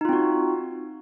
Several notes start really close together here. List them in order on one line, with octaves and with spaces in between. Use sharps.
D#4 F4 C4 F#4